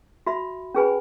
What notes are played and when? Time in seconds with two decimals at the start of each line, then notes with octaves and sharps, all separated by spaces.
0.27 F#4 E5 B5
0.74 C#4 G#4 B4 G#5 B5